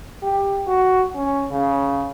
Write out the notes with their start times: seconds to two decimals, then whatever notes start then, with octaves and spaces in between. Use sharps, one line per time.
0.23 G4
0.67 F#4
1.15 C#4
1.51 C#3